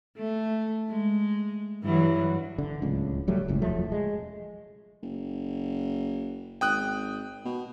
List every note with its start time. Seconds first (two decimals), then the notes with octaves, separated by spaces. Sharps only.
0.17 A3
0.90 G#3
1.83 G2 E3 F#3
2.58 D3
2.82 D1 C#2
3.28 D1 F#3 G3 A3
3.48 F#1 C#2 A2
3.62 E1 F3 F#3 A3
3.92 G#3
5.02 F#1
6.61 G#1 G5 D#6 F#6
7.45 B2